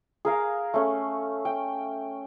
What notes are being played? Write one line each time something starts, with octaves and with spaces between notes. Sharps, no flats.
G#4 A#4 F5
A3 C#4
G5